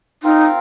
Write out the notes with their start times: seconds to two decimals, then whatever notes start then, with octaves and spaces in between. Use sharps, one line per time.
0.23 C4 D#4 F4 A#4 F5